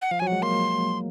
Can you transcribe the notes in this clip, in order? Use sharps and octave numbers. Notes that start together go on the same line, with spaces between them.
F#5
F3 F5
F#3 G#5
F#5
G#3
A#3 C6